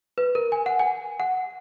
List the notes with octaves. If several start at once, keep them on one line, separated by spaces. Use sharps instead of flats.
B4
A#4
G#5
F#5
G#5
F#5